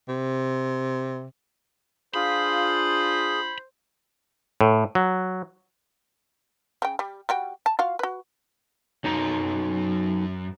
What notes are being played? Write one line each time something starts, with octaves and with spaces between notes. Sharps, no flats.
C3
D4 F4 G#4 C5 B5
A2
F#3
C#3 G5
G3
G3 F#4 G5
A5
F4 F#4 F5
F#4 B4
F#2 F#3 D#4 A#5